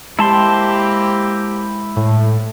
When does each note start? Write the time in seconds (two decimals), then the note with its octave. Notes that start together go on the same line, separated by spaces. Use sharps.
0.19 G#3 A#3 C4 E4 G4 A5 C6
1.96 A2